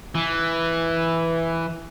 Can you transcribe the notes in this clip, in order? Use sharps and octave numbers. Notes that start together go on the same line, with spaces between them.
E3